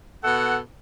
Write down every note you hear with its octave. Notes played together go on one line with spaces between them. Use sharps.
B2 A4 F#5